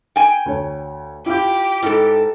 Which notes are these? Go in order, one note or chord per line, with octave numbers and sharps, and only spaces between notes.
G5 G#5
D2 C#5
E4 F4 G4 G6
G#2 E4 A4